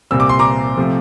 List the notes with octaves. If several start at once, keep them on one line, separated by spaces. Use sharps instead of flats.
C2 A#2 G3 C4 E6
D6
C6
A#5 D6
C3 F3 A3